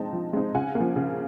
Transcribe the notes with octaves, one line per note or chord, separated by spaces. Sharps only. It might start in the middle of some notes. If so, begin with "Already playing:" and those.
Already playing: F3 G#3 C4 D#4 G5 A5
F3
G#3 C4 D#4
C#3 F#5 G#5
A#3
F3
C#3